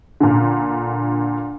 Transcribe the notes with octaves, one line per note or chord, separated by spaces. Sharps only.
A#2 D3